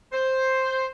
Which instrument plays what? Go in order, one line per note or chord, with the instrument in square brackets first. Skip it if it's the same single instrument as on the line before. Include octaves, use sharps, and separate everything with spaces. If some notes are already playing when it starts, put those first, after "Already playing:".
[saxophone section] C5